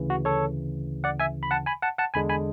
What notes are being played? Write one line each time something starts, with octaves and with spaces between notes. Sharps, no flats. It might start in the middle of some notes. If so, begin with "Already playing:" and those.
Already playing: D2 C#3 E3
F#4
A4 C#5
D5 F#5
E5 G#5
B5
F#5 A5
G#5 B5
F#5 A5
F#5 A5
E2 D3 G#3 D4 G#5 B5
G#5 B5